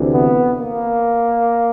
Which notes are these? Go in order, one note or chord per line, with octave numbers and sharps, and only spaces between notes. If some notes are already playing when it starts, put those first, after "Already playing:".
Already playing: D2 C3 E3
B3
A#3